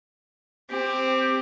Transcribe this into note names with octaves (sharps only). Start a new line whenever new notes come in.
C4 G4